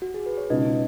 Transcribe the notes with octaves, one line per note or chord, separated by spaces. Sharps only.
F#4
G#4
B4
C#5
C#2 B2 B3 D#4 D#5